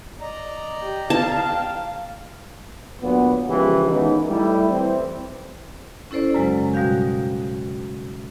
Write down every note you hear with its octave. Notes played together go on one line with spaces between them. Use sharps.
D5 D#5 A#5
G4
F5 A5
G5
D2 A#2 F#3 B3
C#3 E3 F3 G#3 A#3 G4
D#3 E3 G#3 B3 C#4 D#4
G3 A3 E4
E3 C4
C#4 E4 A4 C5 D5
F#2 C#3 F#3 G#3
B2 G3 F#4 F5 G6